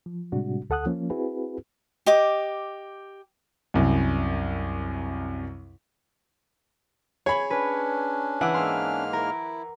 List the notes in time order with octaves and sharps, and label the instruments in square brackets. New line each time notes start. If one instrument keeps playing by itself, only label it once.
[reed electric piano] F3
A2 C3 G3 G#3 D4 F#4
D2 A4 F#5 D#6 F#6
F3 A#3 C#4 F4
C4 E4 F#4 G#4 B4
[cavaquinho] G4 D#5 D6
[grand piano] C2 F#2
[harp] G#4 [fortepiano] C#5 B5
[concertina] C#4 D4 [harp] B4
[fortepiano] E3 [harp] F#5 D6 E6
[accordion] G#2 A#3 F6 [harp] C6
[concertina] E4 [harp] A#4